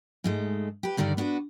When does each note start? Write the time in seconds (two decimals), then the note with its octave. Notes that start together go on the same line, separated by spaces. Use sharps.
0.24 G#2 G#3 A3
0.83 G4 B4
0.97 G2 D3 D#3 A#4 D5
1.17 B3 D4 F#4 A#4 B4